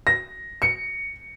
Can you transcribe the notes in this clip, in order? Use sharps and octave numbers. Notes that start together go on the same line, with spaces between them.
A#6
C#7